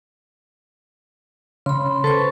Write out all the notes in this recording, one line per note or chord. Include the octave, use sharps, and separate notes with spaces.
C#3 B5 C6
A4 B4 C5 C#6